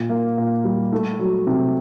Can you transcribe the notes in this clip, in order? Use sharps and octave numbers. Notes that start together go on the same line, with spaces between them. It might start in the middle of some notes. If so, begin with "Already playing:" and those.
Already playing: A#2
A#3
A#2
G3
A3
F#3
C3